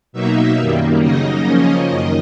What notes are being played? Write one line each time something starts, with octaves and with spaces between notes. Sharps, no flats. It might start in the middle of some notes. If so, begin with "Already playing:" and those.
B2 F#3 A#3 D#4 E5
F#2 D#3 G3 A#3
C#3 F#3 A#3 D#4 D#5
C#3 F3 A#3 C#4
F#2 D#3